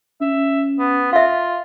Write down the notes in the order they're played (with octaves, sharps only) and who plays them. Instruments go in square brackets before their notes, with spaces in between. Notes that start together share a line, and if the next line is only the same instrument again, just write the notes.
[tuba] C#4 [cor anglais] E5
[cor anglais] B3
[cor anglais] F4 [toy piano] E5 F5